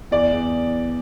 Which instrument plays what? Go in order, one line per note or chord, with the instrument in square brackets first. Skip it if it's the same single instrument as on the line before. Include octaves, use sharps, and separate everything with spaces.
[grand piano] E2 [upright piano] D5
[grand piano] E2